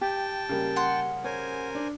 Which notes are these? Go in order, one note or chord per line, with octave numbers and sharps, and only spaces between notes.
G4 G5 A5
C#3 G3 A#3
F#5 C6
A#4 C5 C#5 G#5
D4